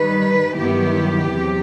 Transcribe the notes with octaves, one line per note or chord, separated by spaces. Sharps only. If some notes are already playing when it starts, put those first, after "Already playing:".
Already playing: D#3 G3 D#4 B4
G2 D#3 F#3 B3 E4 G4
E2 C3 F#3